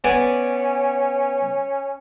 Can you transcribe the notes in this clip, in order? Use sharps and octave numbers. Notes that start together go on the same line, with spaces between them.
B3 C#4 D5 G#5